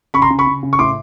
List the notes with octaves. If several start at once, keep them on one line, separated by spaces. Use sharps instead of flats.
C#3 B5 C#6
A#5 C6
C#3
B5 C#6
C#3
C#3
C#6
A2 C6 D6